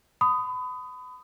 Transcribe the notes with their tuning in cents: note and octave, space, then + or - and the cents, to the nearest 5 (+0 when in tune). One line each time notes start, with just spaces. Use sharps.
B5 +35 D#6 +0